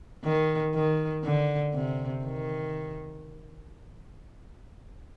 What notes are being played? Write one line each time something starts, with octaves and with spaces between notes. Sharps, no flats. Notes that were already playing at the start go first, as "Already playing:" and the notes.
D#3
D#3
D3
C3
D#3